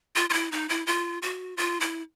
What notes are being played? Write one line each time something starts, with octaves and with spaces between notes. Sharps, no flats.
F4
F4
E4
D#4
E4
F4
F#4
F4
E4